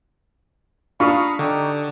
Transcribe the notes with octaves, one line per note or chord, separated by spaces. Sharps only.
D4 F4 F5 A#5 B5 C#6 D#6
D3 D#4 G4